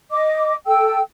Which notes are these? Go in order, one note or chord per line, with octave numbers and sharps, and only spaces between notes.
D#5 D6
A4 G5 E6